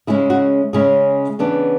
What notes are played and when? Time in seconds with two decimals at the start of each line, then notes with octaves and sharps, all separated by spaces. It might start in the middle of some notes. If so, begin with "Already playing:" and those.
0.07 C#3 G#3 C#4 E4 G#4
0.30 F#4
0.73 C#3 G#3 C#4 E4 G#4
1.39 C#3 E3 B3 D4